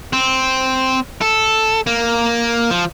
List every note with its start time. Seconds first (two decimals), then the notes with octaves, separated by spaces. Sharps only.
0.13 C4
1.21 A4
1.87 A#3
2.70 F3